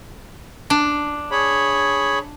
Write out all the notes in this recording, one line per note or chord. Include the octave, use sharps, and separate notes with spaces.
D4
G#4 C#5 B5